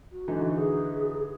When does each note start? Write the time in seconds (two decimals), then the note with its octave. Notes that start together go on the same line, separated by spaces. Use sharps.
0.12 F#4
0.28 D3 E3 D#4
0.55 G#4